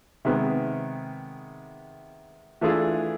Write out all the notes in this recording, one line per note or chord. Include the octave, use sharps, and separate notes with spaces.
C3 D#3 G#3 B3
E3 A3 D4 F4 G#4